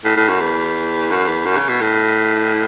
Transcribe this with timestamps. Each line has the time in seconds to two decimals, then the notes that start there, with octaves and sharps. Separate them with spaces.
0.04 A2
0.16 A2
0.28 F#2
0.40 E2
1.11 F#2
1.27 E2
1.45 F#2
1.57 C#3
1.68 B2
1.81 A2